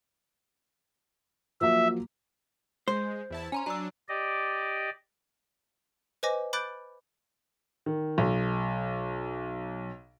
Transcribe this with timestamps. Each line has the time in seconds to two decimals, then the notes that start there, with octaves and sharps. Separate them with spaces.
1.61 F3 F#3 A#3 E5
2.88 G#3 C5
3.30 E2 E4 A5
3.52 C#4 G#5 A#5 C6
3.66 F#3 D4 A#5 E6
4.09 G4 D5 D#5
6.23 B4 C5 D#5 G#5 D6 A#6
6.53 B5 D6 F#6 G6 A6 D7
7.86 D#3
8.18 B1